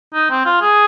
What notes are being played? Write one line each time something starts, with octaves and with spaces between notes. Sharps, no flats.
D#4
C4
F4
G#4